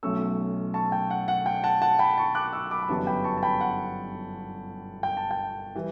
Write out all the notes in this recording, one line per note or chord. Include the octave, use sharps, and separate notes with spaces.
B1 B2 A3 C#4 C#6 E6
A5 C#6
G5
F#5
F#5
G5
F#5 A5
F#5 A5
G5 B5
A5 C#6
D6 F#6
C#6 E6
B5 D6
B5
G1 F#2 E3 G3 B3 A5 C#6
G5 B5
A5 C#6
A5
G5 B5
F#5
G5
A5
G5
E3 G3